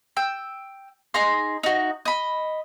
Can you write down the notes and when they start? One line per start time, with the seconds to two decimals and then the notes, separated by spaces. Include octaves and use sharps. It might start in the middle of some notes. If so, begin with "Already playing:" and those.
0.17 G5 E6
1.14 D#4 G#4 A#5 C6
1.63 D#4 F#4
2.05 D#5 B5